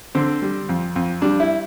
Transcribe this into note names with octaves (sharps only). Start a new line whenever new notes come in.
D3 C4
G3
F2
F2
G3 D4
E4